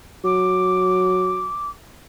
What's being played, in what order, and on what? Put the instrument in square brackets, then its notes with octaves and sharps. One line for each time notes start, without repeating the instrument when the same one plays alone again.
[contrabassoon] F#3 [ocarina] D6